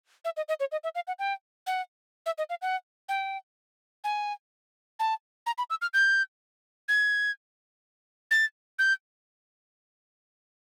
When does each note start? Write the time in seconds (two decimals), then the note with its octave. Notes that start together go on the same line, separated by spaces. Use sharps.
0.25 E5
0.37 D#5
0.48 D#5
0.60 C#5
0.72 D#5
0.83 E5
0.95 F5
1.07 F#5
1.19 G5
1.67 F#5
2.26 E5
2.38 D#5
2.50 F5
2.62 F#5
3.09 G5
4.04 G#5
4.99 A5
5.46 A#5
5.58 B5
5.70 E6
5.82 F6
5.94 G6
6.88 G#6
8.31 A6
8.79 G6